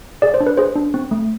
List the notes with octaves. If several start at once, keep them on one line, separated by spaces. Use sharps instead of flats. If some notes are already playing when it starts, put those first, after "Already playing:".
G#4 D5
C5
D4
B4
G#4 C5
D4
C4
A3